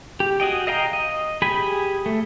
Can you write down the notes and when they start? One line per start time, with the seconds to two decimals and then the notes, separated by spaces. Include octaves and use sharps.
0.20 G4
0.40 F#4 G#4 D#5 G5
0.67 D#5 F5 G5 A#5
0.93 D#5
1.42 G4 G#4 G#5 B5
2.06 A3